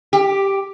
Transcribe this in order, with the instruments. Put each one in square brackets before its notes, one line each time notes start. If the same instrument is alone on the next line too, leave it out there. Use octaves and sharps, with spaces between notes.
[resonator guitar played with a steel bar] G4